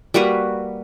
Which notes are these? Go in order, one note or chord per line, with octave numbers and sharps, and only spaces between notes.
G3 A#3 F#4 B4